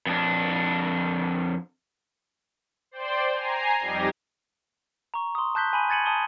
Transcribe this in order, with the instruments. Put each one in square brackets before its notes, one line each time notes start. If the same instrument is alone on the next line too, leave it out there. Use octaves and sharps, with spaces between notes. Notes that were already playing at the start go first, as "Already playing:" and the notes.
[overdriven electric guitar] F2 D4
[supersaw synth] C5 D5 G5 C6
G#5 A#5 C7
F2 G3 D#4 G4 G#6 A#6
[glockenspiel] A#5 C#6
C6 D#6
A5 F#6 G6 B6 G7
G#5 B5 D#7
G#5 G#6 A6 C#7 D#7 F#7
A5 D#6 D#7 G7